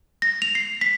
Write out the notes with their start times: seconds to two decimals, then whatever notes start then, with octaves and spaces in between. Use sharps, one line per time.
0.22 A#6
0.42 F7
0.55 C7
0.81 B6